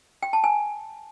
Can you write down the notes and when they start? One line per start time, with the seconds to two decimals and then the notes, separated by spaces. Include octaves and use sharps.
0.23 G5
0.33 A5
0.44 G#5